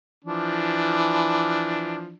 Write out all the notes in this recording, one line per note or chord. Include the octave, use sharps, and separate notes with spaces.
E3 F3 D4